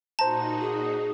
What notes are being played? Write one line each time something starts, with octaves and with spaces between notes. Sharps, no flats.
A#2 D#4 F#4 C5 A5 A#5
G#4